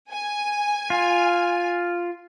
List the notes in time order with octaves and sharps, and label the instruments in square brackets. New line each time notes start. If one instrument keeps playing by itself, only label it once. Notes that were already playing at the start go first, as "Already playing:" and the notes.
[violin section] G#5
[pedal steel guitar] F4